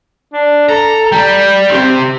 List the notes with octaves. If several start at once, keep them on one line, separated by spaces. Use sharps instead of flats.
D4
A4 A#5
G3 G5
G4 C5